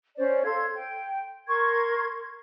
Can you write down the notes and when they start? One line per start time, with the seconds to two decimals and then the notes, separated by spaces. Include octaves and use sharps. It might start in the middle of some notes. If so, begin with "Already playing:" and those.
0.17 C#4 C5 D5
0.44 A4 F5 C6 G#6
0.75 G5
1.48 A#4 C6 C#6 G#6